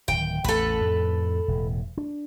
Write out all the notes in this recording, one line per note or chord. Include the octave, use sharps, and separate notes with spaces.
D1 D#3 G5
A1 E2 A4 B4
F2 A2
E1 A2
D4